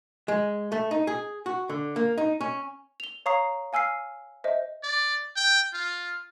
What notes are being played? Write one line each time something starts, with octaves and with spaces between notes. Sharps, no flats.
G#3
A3
D#4
G#4
F#4
D3
A#3
D#4
C#4
F7 G7
C#5 F5 A#5 C#6 D#6 C7
F5 G#5 E6 F6 C7
C5 D#5 E5
D5
G5
F4